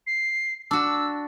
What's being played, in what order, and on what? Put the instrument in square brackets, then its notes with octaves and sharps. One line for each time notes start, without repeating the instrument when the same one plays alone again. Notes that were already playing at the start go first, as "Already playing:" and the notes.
[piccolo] C7
[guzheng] D4 F#4 [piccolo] E6